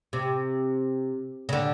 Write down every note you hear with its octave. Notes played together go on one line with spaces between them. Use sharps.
C3
C#3
D3